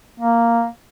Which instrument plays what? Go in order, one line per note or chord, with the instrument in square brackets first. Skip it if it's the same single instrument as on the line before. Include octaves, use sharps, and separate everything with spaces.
[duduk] A#3